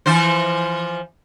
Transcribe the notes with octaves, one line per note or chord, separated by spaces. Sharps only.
E3 F3 C5